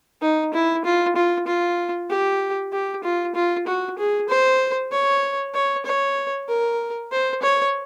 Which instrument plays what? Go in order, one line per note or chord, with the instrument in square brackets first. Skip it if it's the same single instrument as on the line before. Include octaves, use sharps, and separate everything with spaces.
[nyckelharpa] D#4
E4
F4
F4
F4
G4
G4
F4
F4
F#4
G#4
C5
C#5
C#5
C#5
A#4
C5
C#5